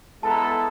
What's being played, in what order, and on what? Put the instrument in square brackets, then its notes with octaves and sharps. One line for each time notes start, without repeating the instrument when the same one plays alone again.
[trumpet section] G#3 B3 E4 A4 [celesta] A5
[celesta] A#5
A5
A5